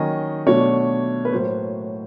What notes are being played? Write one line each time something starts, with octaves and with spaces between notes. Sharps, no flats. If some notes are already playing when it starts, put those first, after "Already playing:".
Already playing: D#3 F#3 A#3 C#4 D#5
B2 F#3 A3 D4 C#5
B4
A2 F#3 A#3 C5